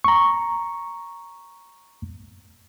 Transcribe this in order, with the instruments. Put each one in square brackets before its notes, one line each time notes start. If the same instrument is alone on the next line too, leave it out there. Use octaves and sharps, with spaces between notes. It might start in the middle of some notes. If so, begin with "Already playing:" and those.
[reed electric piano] A#5 C#6